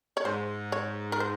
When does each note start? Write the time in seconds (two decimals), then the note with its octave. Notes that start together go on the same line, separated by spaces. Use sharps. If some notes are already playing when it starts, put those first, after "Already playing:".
0.17 C#5
0.25 G#2 C5
0.72 C#5
1.12 A#4
1.20 C5